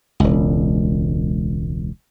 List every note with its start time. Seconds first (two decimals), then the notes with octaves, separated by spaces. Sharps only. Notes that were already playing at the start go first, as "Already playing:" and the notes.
0.20 E1 C#2